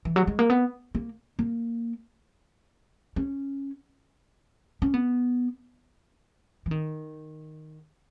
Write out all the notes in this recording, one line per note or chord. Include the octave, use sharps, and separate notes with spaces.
E3
F#3
G#3
A#3
B3
A#3
A#3
C#4
C#4
B3
E3
D#3